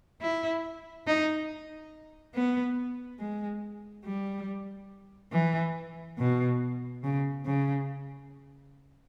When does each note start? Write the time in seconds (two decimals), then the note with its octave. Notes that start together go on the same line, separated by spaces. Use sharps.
0.21 E4
1.07 D#4
2.34 B3
3.19 G#3
4.05 G3
5.32 E3
6.18 B2
7.04 C#3
7.46 C#3